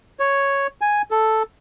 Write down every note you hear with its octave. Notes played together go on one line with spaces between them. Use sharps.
C#5
G#5
A4